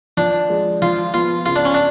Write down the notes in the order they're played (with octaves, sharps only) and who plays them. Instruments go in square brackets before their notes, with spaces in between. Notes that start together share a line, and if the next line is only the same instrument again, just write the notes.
[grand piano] F3 [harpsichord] D4
[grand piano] G#3
[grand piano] F3 [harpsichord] F4
[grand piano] B3 [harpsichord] F4
[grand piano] C#3 [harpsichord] F4
[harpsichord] D4
C#4
D4